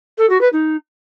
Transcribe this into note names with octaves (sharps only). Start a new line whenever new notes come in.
A4
F#4
B4
D#4